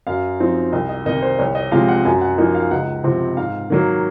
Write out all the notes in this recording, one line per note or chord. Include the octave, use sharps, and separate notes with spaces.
F#2 F5
F3 C4 D#4
C2 D#5
D#5
C3 D#3 A#3 D#4 D#5
C5
C2 C#5
D#5
C3 F3 G#3 F5
F#5
F#2 G#5
F#5
F3 A#3 D#4 D#5
F5
C#2 F#5
C3 F3 C4
G#2 F5
D#3 F#3 A#3